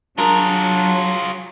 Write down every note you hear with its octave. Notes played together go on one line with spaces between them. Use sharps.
F#3 D4 F4 G#4 A#4